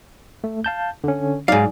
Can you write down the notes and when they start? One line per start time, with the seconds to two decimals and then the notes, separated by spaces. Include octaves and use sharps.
0.44 A3
0.64 F5 A5 G6
1.04 D3 C#4
1.48 G#2 F#3 D#4 D5 F5